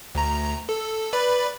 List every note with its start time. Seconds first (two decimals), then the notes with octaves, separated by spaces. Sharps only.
0.15 D2 A#5
0.69 A4
1.13 B4 D5 B5